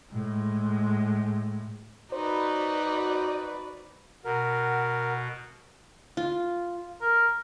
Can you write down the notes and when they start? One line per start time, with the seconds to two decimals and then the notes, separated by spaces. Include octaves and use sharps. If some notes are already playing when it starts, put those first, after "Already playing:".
0.12 A2 G#3
2.12 D#4 F#4 B4 C5 D5
4.25 B2 A#4 F#5
6.17 F4
7.01 A#4